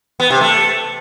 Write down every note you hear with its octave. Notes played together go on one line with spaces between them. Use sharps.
B3
C3
A3